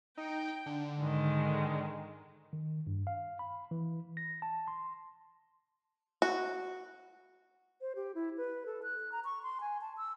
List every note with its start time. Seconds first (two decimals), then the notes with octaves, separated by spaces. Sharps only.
0.17 D#4 G5
0.66 D3
0.99 G#2 D#3 G#3
2.53 D#3
2.87 G2
3.07 F5
3.39 B5
3.71 E3
4.17 A#6
4.42 A5
4.68 C6
6.22 F#4
7.81 C5
7.96 G4
8.15 E4
8.37 B4
8.66 A4
8.83 F#6
9.12 A#5
9.25 C#6
9.43 C6
9.61 G#5
9.81 A5
9.97 E6